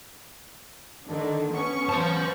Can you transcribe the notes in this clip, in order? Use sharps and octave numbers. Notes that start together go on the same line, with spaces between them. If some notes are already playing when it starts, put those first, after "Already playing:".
D3 D#3 D4
B3 C#4 C#6
C5 A5